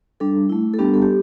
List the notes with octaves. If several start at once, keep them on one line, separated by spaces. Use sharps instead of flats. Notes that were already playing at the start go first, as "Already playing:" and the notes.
G3 D4 A4
A3 E4
A4
G3 B3 D4 G4
A4
G4